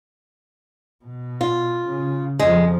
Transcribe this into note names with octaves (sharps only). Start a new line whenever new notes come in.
B2
F4
C#3
F2 F3 G#3